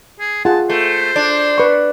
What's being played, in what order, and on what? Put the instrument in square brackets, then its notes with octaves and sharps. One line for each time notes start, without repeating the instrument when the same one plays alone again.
[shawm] G#4
[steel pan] F4 G#4 F#5 [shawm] A5
[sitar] A3 [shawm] C5
[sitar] D4
[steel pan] B4 C#6